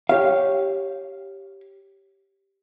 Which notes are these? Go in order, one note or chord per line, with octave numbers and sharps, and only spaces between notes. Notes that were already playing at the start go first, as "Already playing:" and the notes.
G4 C#5 F5